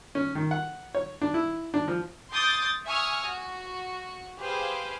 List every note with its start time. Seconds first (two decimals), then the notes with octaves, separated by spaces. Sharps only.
0.15 C#4
0.35 D#3
0.51 F#5
0.95 C#5
1.22 D4
1.34 E4
1.74 D4
1.88 F3
2.31 C6 D6 D#6 G6 A6
2.86 E5 G#5 C#6 D#6 F6
3.26 F#4
4.38 G4 G#4 B4 C5 F5